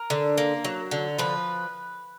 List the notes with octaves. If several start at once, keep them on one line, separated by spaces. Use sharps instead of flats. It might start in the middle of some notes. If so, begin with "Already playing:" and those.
Already playing: A#4
D3
A#3
F#3
D3
F3 B4